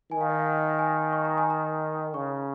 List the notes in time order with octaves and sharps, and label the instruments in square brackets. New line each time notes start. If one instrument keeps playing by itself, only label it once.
[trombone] D#3 [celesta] G#5
[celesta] F5
D#5
F5
G#5
C#6
A#5
G#5
A#5
[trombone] C#3 [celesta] C#6